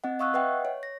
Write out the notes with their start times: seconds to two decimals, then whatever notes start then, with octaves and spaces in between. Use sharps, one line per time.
0.04 C4 D#5 F#5
0.19 D#5 F5 C#6 D#6 E6 F#6
0.34 B4 D#5 E5 F#5 G5
0.65 C#5
0.83 A#6